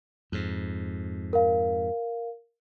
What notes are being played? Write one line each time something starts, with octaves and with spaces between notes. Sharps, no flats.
F2 G#2
A#4 F5